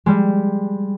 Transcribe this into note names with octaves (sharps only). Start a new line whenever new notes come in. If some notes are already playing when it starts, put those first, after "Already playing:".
G3 G#3